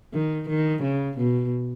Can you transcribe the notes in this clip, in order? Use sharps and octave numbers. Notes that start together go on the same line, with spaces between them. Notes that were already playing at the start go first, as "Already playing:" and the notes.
D#3
D#3
C#3
B2